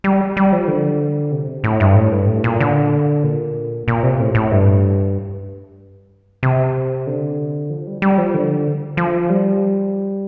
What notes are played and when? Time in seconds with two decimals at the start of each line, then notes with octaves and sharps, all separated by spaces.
0.04 G3
0.37 G3
0.52 F3
0.68 D3
1.32 C3
1.64 A2
1.80 G2
1.96 A2
2.12 G2
2.28 A2
2.44 A#2
2.60 D3
3.24 A#2
3.88 A#2
4.03 C3
4.20 A2
4.35 A2
4.51 G2
6.43 C3
7.07 D3
7.70 F3
7.87 G3
8.02 G3
8.18 F3
8.34 D3
8.97 F3
9.30 G3